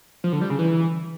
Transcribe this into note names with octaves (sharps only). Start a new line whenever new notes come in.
F3
D3
G3
C#3
E3